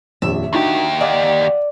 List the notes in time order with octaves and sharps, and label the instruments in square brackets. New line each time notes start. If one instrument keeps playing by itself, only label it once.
[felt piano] D#1 A#1 F2 [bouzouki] E5
[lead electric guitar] D#2 G4 [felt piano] D4 D#4 F#4
[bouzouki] D5 [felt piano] D#5 F5 F#5